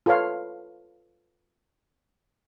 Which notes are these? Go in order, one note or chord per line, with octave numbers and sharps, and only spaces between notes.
F4 A4 B4 C#5 F5